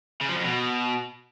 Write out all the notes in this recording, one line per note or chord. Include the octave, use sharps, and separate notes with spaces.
C#3
F3
F2
B2